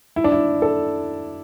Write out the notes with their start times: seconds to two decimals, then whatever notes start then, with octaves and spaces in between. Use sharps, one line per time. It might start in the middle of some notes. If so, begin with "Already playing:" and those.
0.16 E4
0.24 D4
0.32 E4
0.62 A4